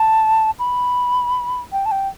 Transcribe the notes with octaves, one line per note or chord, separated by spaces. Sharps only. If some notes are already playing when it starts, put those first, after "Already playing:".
Already playing: A5
B5
G5
A5
G5